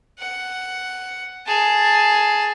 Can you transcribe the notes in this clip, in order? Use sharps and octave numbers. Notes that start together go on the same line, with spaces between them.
F#5
G#4 A5